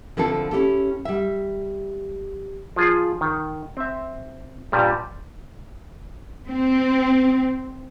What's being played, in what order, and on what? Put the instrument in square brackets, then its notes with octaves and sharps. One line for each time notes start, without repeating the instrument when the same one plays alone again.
[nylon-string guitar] D3 F3 C4 E4 A4
C#4 E4 G4 A4
G3 E5
[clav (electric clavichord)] F3 F4 G#4
D#3
C4 E5
G2 A#2 G3
[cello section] C4